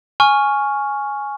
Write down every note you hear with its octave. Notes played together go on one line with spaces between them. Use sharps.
G#5 C#6 F6